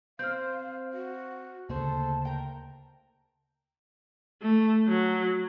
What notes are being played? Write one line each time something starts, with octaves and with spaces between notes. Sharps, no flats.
C4 C5 F5 F6 G6
F#4
D2 C#3 A#3 G#4 A4 C5 A5
A#4 G5
A3
F#3